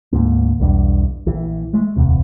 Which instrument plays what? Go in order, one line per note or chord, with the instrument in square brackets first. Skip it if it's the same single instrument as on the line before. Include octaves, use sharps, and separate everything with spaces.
[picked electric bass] D2 G#2 A#3
B1 E2 G2
A#1 E3
G#3 A3
D1 E2 C3